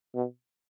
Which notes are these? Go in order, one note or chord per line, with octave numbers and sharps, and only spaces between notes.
B2